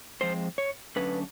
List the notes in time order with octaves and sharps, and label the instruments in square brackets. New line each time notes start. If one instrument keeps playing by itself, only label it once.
[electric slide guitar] F3 G#3 C4 C5
C#5
D3 F#3 A3 C#4 B4